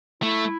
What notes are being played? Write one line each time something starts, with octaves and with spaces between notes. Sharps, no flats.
A3 E4